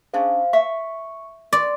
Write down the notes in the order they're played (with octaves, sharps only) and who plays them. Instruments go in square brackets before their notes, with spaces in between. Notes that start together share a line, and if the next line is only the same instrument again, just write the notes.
[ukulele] C#4 D4 G#4 [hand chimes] C5 F5
[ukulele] E5 [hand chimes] C#6
[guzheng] D5 [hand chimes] C6